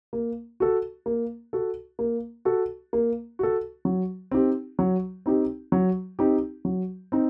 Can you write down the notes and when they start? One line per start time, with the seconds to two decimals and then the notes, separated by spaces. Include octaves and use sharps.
0.13 A#3
0.60 F#4 A4
1.06 A#3
1.53 F#4 A4
1.99 A#3
2.45 F#4 A4
2.93 A#3
3.39 F#4 A4
3.85 F#3
4.31 C4 D#4 G4
4.79 F#3
5.26 C4 D#4 G4
5.72 F#3
6.19 C4 D#4 G4
6.65 F#3
7.12 C4 D#4